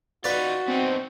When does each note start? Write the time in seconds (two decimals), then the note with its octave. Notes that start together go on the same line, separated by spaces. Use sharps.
0.24 D#4 F4 F#4 B4 D5
0.68 B3 C4 D4 D#4